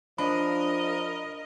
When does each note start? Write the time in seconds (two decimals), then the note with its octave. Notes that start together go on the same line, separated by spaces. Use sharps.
0.18 F3 D4 A#4 D#5 B5